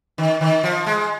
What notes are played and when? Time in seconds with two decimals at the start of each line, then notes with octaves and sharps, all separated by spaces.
0.18 D#3
0.41 D#3
0.63 F3
0.86 G#3